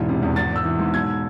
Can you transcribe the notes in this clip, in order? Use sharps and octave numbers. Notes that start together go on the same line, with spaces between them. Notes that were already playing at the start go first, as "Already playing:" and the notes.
Already playing: E1 G#2 E3
C3
E2
G#1 A6
G#1 E6
E3
G#2
B1 G#6